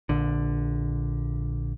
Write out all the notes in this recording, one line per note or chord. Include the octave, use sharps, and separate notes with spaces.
A#1 D3